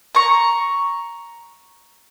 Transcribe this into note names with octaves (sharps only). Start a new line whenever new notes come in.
A#5 C#6